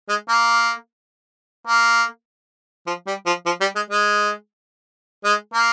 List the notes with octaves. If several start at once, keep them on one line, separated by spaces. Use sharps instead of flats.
G#3
A#3
A#3
F3
G3
F3
F3
G3
G#3
G#3
G#3
A#3